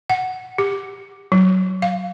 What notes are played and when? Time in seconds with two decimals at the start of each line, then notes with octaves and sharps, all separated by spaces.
0.10 F#5
0.58 G4
1.32 F#3
1.82 F5